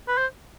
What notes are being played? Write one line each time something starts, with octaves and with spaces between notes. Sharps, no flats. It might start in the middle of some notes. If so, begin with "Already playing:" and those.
B4
C5